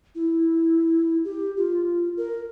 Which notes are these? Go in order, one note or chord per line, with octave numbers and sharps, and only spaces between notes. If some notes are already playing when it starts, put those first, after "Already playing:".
E4
G4
F4
A#4